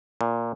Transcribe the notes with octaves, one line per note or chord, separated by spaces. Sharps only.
A#2